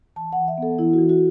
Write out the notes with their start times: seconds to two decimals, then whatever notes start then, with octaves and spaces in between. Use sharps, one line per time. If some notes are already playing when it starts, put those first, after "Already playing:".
0.16 E3 A5
0.33 E3 F#5
0.48 E5
0.58 B3 A4
0.79 E3 E4
0.93 F#4
0.99 E3
1.09 F#4